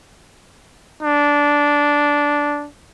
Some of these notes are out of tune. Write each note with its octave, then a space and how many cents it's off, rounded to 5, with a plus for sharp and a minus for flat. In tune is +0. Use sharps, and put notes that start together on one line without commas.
D4 -10